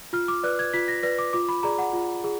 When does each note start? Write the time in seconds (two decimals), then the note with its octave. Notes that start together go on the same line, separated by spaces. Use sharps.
0.13 F4 F6
0.28 D6
0.43 B4 D5 F#6
0.59 G#6
0.73 F4 B6
0.88 A#6
1.03 B4 D5 A#6
1.19 D6
1.33 F4 D6
1.48 B5
1.63 G#4 D5 A#5
1.78 F#5
1.93 F4
2.24 G#4